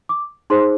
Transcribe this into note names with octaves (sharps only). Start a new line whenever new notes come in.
D6
D#4 G#4 C5 C6